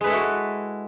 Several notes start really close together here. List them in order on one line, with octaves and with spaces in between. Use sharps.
G#3 B4 A4 E4 F#4